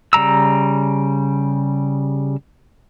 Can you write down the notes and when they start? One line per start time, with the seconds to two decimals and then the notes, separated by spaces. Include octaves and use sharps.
0.13 C#3 G3 A#5 E6